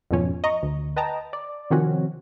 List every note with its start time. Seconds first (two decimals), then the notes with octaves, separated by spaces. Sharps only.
0.11 F2 G#2 B2 F3 C#4
0.44 D#5 A#5 C#6
0.62 D2
0.96 B4 D#5 G5 A5 A#5
1.33 D5
1.70 C3 D#3 F3 C4 C#4 F#4